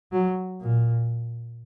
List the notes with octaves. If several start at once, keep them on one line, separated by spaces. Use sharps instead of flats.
F#3
A#2